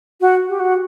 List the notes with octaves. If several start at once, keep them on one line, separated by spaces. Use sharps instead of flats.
F#4
G4
F#4